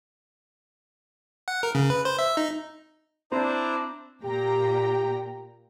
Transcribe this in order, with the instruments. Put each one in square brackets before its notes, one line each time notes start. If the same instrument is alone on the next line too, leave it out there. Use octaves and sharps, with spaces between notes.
[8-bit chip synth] F#5
A#4
C#3
B4
C5
E5
D#4
[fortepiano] C4 [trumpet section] D4 [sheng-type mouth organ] E4 C5 A#5
[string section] A#2 G5 A#5 [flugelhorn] G4